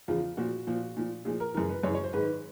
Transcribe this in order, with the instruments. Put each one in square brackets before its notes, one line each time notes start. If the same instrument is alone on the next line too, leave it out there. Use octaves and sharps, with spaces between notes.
[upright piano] E2 C#3 F3 F4
A#2 F3 F#4
A#2 F3
A#2 F3
A#2 F3 G#4
A#4
F#2 C#3 E3 A#4
B4
F#2 C#3 E3 C#5
C#5
C5
G#2 D#3 B4